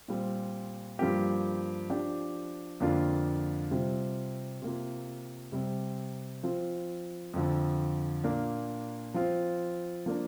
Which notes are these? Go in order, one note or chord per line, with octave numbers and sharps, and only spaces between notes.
A#2 G3 C4
G2 F3 A#3 G4
F3 D4 G4
F2 D3 A#3 D4 F4
C3 G3 C4 F4
C3 A#3 F4
C3 G3 C4
F3 C4 F4
F2 D3 F3
A#2 A#3 D4
F3 C4 F4
F3 A#3 D4